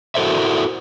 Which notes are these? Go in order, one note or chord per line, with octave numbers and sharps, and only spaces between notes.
E4 F#4 A4 A#4 C5 E5